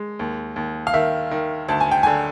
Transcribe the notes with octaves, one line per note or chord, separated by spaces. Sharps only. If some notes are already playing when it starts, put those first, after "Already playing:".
Already playing: G#3
D#2
D#2
F5
D#3 E5
D#3
D2 A5
G#5
G5
D3 G#5